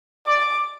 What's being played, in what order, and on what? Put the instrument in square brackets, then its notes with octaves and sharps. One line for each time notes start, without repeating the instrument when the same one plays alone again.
[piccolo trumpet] D5 [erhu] D6